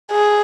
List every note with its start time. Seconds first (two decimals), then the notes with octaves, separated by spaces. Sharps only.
0.12 G#4